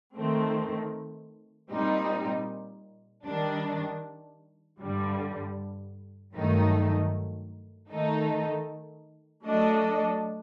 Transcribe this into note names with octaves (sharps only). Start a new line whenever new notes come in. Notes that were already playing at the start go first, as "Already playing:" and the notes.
D#3 A3 C4
A#2 G3 C4 D#4
D#3 G3 D4
G2 D3 G3
G2 D#3 F#3 A3 D#4
D#3 A3 D#4 A4
F#3 A3 D4 A4 D#5